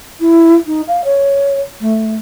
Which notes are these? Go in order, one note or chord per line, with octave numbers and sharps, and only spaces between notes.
E4
D#4
F5
C#5
A3